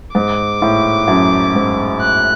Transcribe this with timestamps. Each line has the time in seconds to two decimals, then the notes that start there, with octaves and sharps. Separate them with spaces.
0.15 G#2 D6
0.62 A2
1.08 F#2
1.55 G#2
2.01 F#6